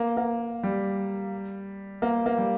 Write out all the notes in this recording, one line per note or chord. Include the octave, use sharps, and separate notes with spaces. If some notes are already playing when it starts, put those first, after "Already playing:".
Already playing: A#3
A#3
G3
A#3
A#3
G3